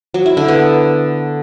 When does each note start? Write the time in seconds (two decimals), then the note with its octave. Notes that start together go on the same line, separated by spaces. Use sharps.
0.14 F#3
0.26 E4
0.37 D3
0.48 B3